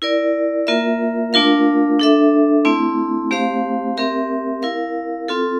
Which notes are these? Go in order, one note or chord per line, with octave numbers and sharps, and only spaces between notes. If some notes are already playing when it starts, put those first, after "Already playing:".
E4 A#4 D5
A#3 F4 A#4 E5
A3 D4 F4 A#4 F5
D4 A4 E5
A3 C4 E4
A3 C4 G4 C5 F5
C4 G4 A#4 E5
E4 A#4 F5
C4 F4 A4